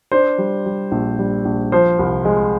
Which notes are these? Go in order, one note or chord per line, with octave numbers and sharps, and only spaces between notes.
D4 C5
G3
G3
A#1
G3
A#1
F3 C5
C2
G#3